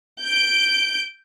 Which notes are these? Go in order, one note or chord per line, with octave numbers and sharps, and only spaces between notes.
G6 D7